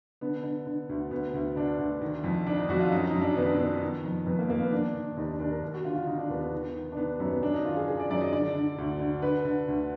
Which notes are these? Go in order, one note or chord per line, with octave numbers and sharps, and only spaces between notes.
D3 B3
D3
D3
D2
D2 B3
D2
D3 D4
D2
D#3
F2
D#3 D4
D#4
F2 F#4
F4
F#2 D#4
D#4
F#2
D4
D#3 B3
D4
D#3 B3
D#3
F2
F2 B3
A#3
F2 A#3
B3
D#3 D4
D#3
D#2 D#4
D4
D#2 D4
A#4
D#2
F#4
D3 F4
F4
D3 D#4
D4
D#2 B3
B3
D#3
D#3
D4
D#3 B3
F#2 B3
B3
F#2 D4
D#4
D#3 F4
G#4
D#3 G#4
D5
F#2 D5
D#5
D3 D5
D3
D2
D3
D3 B4
D3
D2